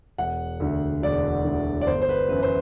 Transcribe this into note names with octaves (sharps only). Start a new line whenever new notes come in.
E1 F#5
D2 D3
E1 D5
D2 D3
D5
G1 C5
C5
B4
F#2 E3 B4
C5